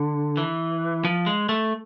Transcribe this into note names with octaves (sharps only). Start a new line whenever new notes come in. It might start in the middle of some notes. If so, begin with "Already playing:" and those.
Already playing: D3
E3
F3
G#3
A3